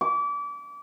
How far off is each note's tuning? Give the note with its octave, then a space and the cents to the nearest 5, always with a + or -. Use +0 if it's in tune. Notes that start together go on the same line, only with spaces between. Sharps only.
D6 -30